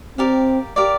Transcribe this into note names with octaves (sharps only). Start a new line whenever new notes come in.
C4 G4 A#4 D5 F5
G4 A#4 D5 F5